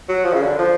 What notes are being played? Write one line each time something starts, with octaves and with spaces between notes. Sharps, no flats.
F#3
F3
C#3
D3
F3